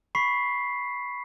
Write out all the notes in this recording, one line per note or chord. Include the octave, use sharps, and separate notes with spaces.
B5 C#6 B6 C7